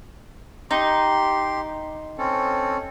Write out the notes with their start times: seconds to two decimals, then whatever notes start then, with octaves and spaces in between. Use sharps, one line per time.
0.71 D#4 G4 C6
2.18 C4 C#4 A4